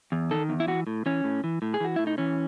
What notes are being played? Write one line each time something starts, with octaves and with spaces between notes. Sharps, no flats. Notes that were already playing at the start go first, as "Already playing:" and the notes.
E2
D#3 A4
E2
E4
E3 F#4
A2
E3 C#4
A2
E3
A2
G#4
E3 F#4
A2 E4
D#4
E3 C#4